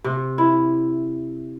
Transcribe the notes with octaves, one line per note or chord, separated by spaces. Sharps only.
C3
E4